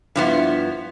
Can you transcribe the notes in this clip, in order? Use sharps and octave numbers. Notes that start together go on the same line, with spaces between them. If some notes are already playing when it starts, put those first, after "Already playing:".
G2 F3 B3 E4